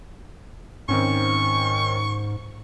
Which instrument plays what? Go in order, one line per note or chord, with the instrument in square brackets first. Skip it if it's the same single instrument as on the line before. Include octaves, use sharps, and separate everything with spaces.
[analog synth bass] G#2 [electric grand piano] D#3 C4 C#4 [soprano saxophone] C#6